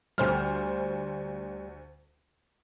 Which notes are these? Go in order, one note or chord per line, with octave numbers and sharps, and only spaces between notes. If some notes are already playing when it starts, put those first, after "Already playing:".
D2 G3 C5 F6